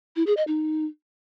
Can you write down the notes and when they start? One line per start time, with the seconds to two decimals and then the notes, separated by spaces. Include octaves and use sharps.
0.16 E4
0.27 G#4
0.37 D#5
0.47 D#4